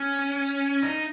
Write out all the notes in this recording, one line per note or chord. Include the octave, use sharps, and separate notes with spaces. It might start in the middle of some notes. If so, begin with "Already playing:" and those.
Already playing: C#4
D#4